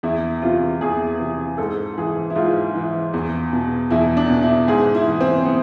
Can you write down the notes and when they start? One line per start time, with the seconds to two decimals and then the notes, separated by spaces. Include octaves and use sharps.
0.03 E2 E4
0.42 C3 E3 F4
0.81 E2 G#4
1.20 C3 E3
1.58 G#2 A4
1.98 E3 G#4
2.30 E4
2.36 G#2 F4
2.75 E3
3.14 E2
3.53 B2
3.90 E2 E4
4.17 D4
4.29 B2
4.43 E4
4.68 G#2 G#4
4.95 E4
5.08 E3
5.21 C4
5.46 B3